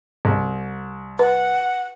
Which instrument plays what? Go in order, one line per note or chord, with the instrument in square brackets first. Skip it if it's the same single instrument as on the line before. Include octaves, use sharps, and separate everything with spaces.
[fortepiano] C2
[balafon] B4 [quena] F#5